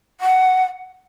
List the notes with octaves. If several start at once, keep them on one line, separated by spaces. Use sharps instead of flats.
F#5